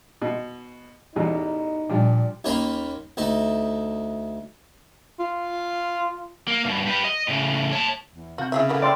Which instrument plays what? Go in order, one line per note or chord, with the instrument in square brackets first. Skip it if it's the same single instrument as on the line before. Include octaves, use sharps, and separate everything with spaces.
[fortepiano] B2
[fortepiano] A1 E2 B2 [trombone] D#4
[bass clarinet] A#2 [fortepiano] F3 G3 D4
[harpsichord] D#2 A#3 C#4 C#5 B5 C6
D2 A3 D#4
[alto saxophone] F4
[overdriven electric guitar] A#3
G2 B2
G4 B4
D#5
A2 C#3
C#5 A5
[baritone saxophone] E2
[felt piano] C3 G6 [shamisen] F4 F#4
[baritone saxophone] C#3 [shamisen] E4 G#4 E5
[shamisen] A#3 B3 E4 [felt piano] G#4 A4
[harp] D5 C6 [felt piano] G5 B5 E6